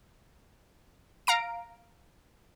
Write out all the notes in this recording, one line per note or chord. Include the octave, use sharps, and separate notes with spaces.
F5 A#5 D7